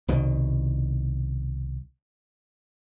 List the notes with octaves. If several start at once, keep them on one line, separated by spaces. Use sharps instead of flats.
C2 B2 D#3